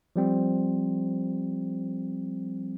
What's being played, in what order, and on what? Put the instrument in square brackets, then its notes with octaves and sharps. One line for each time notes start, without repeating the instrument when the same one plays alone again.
[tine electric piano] F3 G3 C4